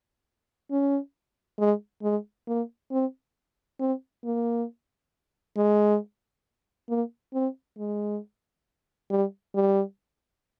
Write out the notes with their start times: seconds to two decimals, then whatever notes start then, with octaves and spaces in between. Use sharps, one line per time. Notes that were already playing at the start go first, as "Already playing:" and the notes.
0.71 C#4
1.59 G#3
2.03 G#3
2.47 A#3
2.91 C4
3.80 C4
4.24 A#3
5.57 G#3
6.89 A#3
7.33 C4
7.78 G#3
9.10 G3
9.55 G3